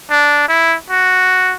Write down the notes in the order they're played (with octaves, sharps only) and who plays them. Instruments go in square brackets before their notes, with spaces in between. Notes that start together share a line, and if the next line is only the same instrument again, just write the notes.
[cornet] D4
E4
F#4